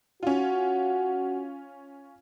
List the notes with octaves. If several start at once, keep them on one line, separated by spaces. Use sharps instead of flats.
C#4 F4 F#4